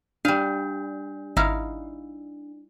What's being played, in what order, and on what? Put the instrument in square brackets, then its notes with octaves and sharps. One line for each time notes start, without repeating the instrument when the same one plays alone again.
[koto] G3 F5 [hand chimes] D4
[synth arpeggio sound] G#1 F6 [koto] D#4 E4 F5